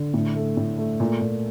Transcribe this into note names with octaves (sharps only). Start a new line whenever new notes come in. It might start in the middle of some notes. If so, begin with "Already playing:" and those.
Already playing: D3
A2
A3
A2
A3
A#2
A#2